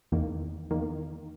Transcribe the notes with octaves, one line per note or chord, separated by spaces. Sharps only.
E2 D#3 A#3
E2 D#3 A#3